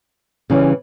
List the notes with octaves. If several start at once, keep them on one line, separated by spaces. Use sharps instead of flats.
C#3 E3 G3 C#4